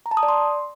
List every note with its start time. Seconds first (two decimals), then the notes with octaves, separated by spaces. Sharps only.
0.06 A#5
0.11 A5
0.17 D#6
0.23 D5
0.29 C6